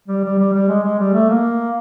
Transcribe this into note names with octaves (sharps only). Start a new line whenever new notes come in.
G3
G3
G3
G3
G#3
G#3
G3
A3
A#3